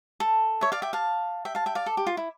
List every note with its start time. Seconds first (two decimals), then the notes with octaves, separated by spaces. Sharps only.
0.20 A4
0.61 C#5 E5
0.72 D5 F5
0.82 E5 G5
0.93 F5 A5
1.45 E5 G5
1.55 F5 A5
1.66 E5 G5
1.75 D5 F5
1.86 A4
1.97 G4
2.07 F4
2.17 E4